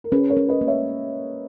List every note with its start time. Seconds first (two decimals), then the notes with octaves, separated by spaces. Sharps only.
0.04 A#4
0.12 C#4 G#4 B4
0.30 A#4 C#5
0.37 C#4
0.48 B4 D#5
0.61 A#3
0.67 C#5 E5